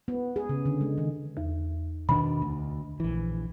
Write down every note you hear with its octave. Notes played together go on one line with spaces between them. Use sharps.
B3
G#4
C#3
D3
G#3
D#3
E2
B2 D#3 D4 B5
D2
A#1 E3